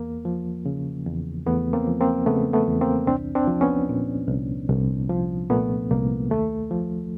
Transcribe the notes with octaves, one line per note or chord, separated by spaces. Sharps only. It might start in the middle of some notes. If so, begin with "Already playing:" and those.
Already playing: E2 A#3
F3
C#3
E2
E2 A3 B3
A#3 C4
F3
A#3 C4
C#3 A3 B3
A3 B3
E2
A#3 C4
C2 C4 D4
C4 D4
F3
B3 C#4
A#2
C2
C2
F3
A#2 A3 B3
C2 A#3
D#2 A3
F3